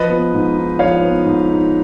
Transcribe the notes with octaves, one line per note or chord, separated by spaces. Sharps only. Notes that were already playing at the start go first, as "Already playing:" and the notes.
Already playing: F3 B4 D#5
B3
G#2
D#4
F3 C#5 F5
B3
G#2
D#4